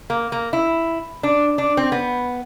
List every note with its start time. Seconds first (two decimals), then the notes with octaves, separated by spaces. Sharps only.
0.10 A#3
0.32 A#3
0.53 E4
1.23 D4
1.58 D4
1.77 C4
1.92 B3